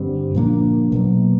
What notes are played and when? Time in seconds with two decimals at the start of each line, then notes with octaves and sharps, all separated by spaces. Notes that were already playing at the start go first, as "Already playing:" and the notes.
Already playing: G2 D3 G3 C4
0.35 A#2 F3 A#3 D4
0.92 B2 F#3 A#3